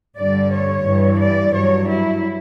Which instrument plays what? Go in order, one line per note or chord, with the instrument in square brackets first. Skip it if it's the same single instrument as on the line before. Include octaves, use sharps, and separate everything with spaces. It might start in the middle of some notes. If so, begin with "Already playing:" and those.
[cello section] G2 D3 G3 D5
C#5
G2 E3 G3
D5
G2 F#3 C#5
E4